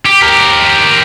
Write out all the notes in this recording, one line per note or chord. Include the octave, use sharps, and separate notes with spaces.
G4
G4 A#4